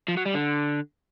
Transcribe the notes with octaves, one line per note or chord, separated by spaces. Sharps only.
F3
F#3
G3
D3